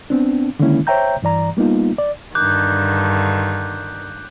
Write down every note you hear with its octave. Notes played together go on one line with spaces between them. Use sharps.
B3 C4 D4
D3 D#3 G#3 A#3 C#4 E4
C5 C#5 E5 G5 A#5 G6
G2 E3 D5 A#5
G3 A#3 B3 D#4 F4
D5
G2 D3 D#3 D6 F#6 G6